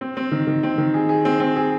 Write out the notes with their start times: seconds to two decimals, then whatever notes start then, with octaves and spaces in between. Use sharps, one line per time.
0.01 C4
0.17 C4
0.31 D#3
0.47 D#3
0.63 C4
0.78 D#3
0.94 G#4
1.09 G#4
1.25 C4
1.40 C4
1.56 G#4